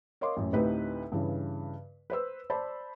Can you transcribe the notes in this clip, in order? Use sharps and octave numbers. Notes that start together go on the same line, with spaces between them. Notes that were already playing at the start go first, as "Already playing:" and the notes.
A#4 C#5 D#5 F5 C6 D6
A1 F#2
D2 A2 C4 D#4 G4 B4
G2 C#3 E3
B4 C5 E6
C5 D5 A5 B5